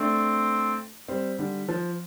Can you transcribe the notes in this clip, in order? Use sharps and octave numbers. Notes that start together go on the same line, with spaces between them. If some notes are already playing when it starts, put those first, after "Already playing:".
Already playing: A3 C4 D4
G3 C4
D3 G3
F3